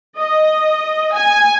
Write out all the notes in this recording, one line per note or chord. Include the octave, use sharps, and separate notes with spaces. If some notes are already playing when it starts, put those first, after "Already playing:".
D#5
G#5